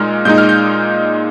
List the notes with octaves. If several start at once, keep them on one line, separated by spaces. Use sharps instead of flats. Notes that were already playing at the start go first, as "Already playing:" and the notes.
Already playing: A#2 G#3 D#4 F6
A#2 G#3 D#4 G6
F6
G6